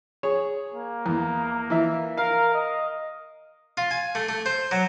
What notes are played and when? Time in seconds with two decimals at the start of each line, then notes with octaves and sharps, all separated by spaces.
0.23 G#4 C#5
0.74 A#3
1.06 E2
1.70 E3 E5
2.17 A#4 F5
2.54 D#5
3.77 F4
3.91 G#5
4.15 A3
4.29 A3
4.46 C5
4.71 F#3